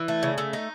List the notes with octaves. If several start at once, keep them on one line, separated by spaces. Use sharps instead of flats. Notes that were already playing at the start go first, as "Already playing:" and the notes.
Already playing: E3
A3
C#3
A3
D#4